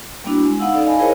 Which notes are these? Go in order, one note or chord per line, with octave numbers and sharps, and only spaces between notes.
G3 A#3 B3 D4 E4 F#4
G#3
B3 D#4 F5 F#5 E6
C#4 D#4 A4 D5
D#5 F5 G#5 A5 B5
E4 G#4 A#4 C5 C#5 D#5